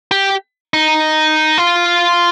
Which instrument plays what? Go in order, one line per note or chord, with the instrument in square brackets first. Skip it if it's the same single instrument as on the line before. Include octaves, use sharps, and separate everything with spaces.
[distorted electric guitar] G4
D#4
F4